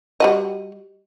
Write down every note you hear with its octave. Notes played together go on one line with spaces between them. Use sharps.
G3 F#4 D#5